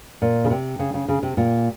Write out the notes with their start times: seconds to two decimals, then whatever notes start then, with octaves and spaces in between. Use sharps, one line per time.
0.22 A#2
0.44 C#3
0.50 C3
0.79 C#3
0.94 C#3
1.09 C#3
1.23 C3
1.37 A#2